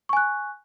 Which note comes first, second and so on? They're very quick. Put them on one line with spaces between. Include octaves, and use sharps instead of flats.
C#6 G#5 F#6